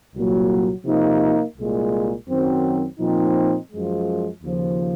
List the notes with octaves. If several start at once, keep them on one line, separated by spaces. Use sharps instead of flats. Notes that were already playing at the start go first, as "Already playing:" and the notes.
C2 A#2 F#3 A#3
C3 F3 A#3 D#4
C2 A#2 G#3
F#2 D#3 F#3 C4
A#2 F3 C4 D#4
F#2 F3 G#3
D#2 C#3 F3